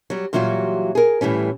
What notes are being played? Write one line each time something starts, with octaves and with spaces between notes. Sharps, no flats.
F#3 G3
A#2 E3 F#3 G3 F4 F#4
G#4 A#4
A2 E3 G3 C#4